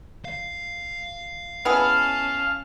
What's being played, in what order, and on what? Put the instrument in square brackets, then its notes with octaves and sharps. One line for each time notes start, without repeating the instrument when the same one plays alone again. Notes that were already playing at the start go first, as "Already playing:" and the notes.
[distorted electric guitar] F5
[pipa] B3 E4 G#4 [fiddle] C#4 A5 [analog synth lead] F6